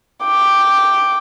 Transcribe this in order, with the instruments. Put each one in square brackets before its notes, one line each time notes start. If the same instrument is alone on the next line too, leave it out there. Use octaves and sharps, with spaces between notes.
[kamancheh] G5 D6